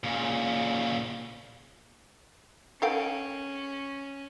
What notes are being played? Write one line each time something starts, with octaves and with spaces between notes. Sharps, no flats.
A#2 C#3
C#4 A4 F5 G5